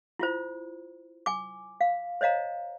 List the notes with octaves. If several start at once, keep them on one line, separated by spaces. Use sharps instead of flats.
E4 F4 C5
G#5 D6
F5
C5 C#5 D#5 F5 A#5